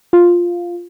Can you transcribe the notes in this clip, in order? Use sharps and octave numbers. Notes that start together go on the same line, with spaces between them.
F4